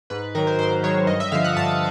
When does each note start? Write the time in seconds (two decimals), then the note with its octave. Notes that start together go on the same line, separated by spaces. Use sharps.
0.10 G#2 B4
0.35 D#3 F#3 A#4
0.47 C5
0.59 G#2 C5
0.83 D#3 F#3 C#5
1.07 G2 D#5
1.20 E5
1.32 D3 F3 F5
1.44 F#5
1.56 G2 A5